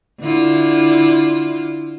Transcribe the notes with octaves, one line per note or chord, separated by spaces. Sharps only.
D3 E4 F4